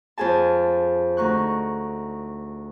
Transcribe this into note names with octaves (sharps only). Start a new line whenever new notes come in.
F2 F4 G#4 G#5 A5
D2 D#4 C#6 F#6